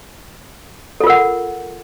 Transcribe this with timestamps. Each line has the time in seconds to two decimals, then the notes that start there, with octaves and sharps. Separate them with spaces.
1.00 A4
1.04 F4
1.07 A#4
1.10 F#5